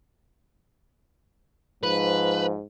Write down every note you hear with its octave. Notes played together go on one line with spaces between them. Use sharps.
G#2 F3 B4